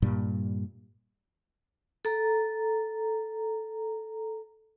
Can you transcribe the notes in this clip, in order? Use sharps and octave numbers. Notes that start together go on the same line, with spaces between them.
G2 A#2 G3
A4 A#5